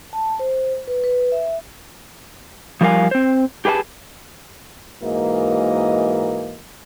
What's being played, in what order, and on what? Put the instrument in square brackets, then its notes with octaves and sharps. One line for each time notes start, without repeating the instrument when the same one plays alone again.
[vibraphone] A5
C5
B4
B4
E5
[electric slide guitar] F3 G3 F4 A#4 F5 G#5
C4 C5
G4 G#4 B4 F5 A5
[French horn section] G#2 E3 A#3 F#4 A#4 D#5